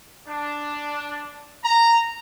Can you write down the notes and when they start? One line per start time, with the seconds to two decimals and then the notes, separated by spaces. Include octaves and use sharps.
0.28 D4
1.64 A#5